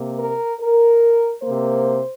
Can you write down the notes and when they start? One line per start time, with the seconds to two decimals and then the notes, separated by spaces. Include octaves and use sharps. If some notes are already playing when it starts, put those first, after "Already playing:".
Already playing: C3 A#3
0.19 A#4
0.60 A#4
1.43 C3 A#3 C5